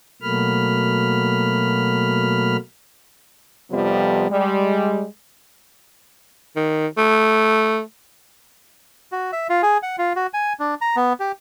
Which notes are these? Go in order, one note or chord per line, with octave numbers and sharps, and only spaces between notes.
B2 F#3 A3 A#3 B5 F6
F2 C3 F3 G3 B3
G3 G#3
D#3
A3
F#4
E5
F4
G#4
F#5
F4
F#4
G#5
D4
A#5
B3
G4